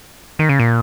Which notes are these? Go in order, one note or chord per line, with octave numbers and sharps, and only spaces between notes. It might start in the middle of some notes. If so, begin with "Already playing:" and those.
D#3
C#3
A#2